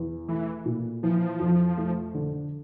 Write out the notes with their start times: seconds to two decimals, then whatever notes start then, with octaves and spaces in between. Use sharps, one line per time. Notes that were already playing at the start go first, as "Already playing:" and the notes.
Already playing: E2
0.28 E3 A3
0.66 A#2
1.03 E3 F3
1.40 F2
1.78 A3
2.14 D3